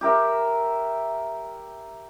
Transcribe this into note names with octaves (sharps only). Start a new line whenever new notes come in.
G4 A#4 E5